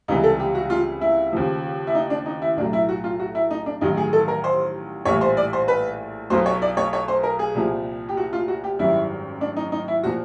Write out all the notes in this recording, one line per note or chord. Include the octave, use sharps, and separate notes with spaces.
C#2 C3 E3 G3 D#4
A4
G4
F#4
F4
E4
D#2 C#3 F3
E4
D#4
D4
D#4
E4
B1 A2 F#3 D4
E4
F#4
F4
F#4
E4
D#4
D4
A1 G2 D#3 F#3 D#4
G#4
A4
A#4
C5
A#1 A2 E3 G3 C#5
C5
D5
C5
B4
B1 B2 F#3 C5
C#5
D5
C#5
C#5
C5
A#4
G#4
C2 A#2 F3
G4
F#4
F4
F#4
G4
G#1 F#2 D#3 G3 E4
D4
D#4
D#4
E4
A#2 F3 F#4